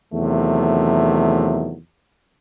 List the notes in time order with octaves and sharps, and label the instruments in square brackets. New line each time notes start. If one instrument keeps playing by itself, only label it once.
[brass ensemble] E2 C3 D#3 F#3 A3